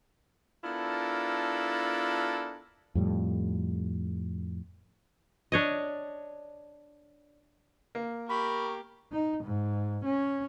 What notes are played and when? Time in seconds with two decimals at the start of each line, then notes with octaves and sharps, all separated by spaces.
0.64 B3 D4 E4 F4 A4 A#4
2.95 F2 A2 G3
5.52 D4 C#5 D#5
7.95 A#3
8.29 G4 A#4 B5 C#6
9.12 D#4
9.44 G#2
10.05 C#4